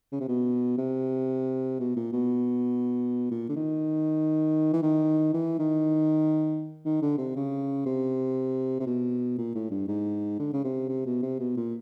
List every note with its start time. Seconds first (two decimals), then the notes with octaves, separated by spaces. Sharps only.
0.12 C#3
0.20 C3
0.28 B2
0.78 C3
1.80 B2
1.96 A#2
2.13 B2
3.31 A#2
3.49 D3
3.56 D#3
4.73 E3
4.83 D#3
5.34 E3
5.59 D#3
6.85 D#3
7.02 D3
7.18 C3
7.36 C#3
7.86 C3
8.80 C3
8.87 B2
9.38 A#2
9.55 A2
9.71 G2
9.88 G#2
10.39 D3
10.53 C#3
10.64 C3
10.89 C3
11.06 B2
11.23 C3
11.40 B2
11.57 A#2